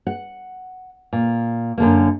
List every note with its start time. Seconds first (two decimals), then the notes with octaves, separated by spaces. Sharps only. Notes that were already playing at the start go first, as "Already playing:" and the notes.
0.07 F#5
1.13 A#2
1.78 F#2 D3 A#3